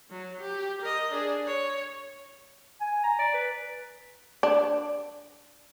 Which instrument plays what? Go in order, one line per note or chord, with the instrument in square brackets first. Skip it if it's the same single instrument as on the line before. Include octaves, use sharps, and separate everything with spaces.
[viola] F#3
G4
A#4 D#5
D4 G#4
C#5
[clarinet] G#5
A#5
D5
B4
[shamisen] D4